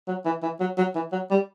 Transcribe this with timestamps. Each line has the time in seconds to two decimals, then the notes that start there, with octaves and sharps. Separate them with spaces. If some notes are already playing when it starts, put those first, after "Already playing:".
0.07 F#3
0.25 E3
0.42 E3
0.60 F#3
0.77 F#3
0.95 E3
1.12 F#3
1.31 G3